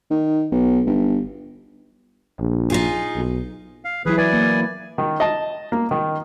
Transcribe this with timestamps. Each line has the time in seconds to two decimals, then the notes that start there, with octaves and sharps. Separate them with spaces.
0.11 D#3
0.52 B1
0.87 G1
2.40 A#1
2.70 D#4 F4 G#4
3.15 B1
3.85 F5
4.06 E3 F#3 E4 G#4 B4
4.17 B4 D5 G#5
4.33 A#3
4.98 D#3
5.20 D#5 A5
5.72 A#3
5.91 D#3